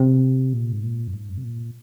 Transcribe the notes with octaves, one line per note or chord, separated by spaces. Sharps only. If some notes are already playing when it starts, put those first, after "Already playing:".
Already playing: C3
A#2
G#2
A#2
F#2
G#2
F#2
C3
A#2